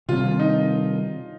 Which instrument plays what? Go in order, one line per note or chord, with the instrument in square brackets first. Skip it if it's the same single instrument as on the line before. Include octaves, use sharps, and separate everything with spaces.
[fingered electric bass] C3 D#3 G3 C4 [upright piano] F4
[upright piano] D#4